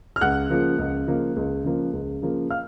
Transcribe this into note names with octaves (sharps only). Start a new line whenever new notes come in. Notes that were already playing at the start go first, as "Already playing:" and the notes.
F6
C#2 F#5 F#6
C#3 F3 A#3
C#2
C#3 F3 A#3
C#2
C#3 F3 A#3
C#2
C#3 F3 A#3
F5 F6